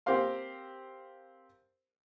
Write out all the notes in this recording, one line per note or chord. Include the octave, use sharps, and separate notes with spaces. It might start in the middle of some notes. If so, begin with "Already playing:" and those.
C4 G4 A#4 C5 F5 C6